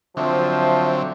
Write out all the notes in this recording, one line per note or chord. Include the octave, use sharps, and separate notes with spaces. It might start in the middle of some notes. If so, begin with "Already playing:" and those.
D3 F3 F#3 C4 E5